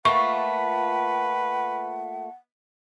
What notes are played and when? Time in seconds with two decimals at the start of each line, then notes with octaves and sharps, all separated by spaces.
0.05 A3 A#3 F4 B4 F#5 C#6